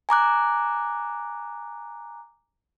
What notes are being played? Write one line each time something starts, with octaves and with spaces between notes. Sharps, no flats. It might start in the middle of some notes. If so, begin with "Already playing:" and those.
G#5 A#5 D6 F#6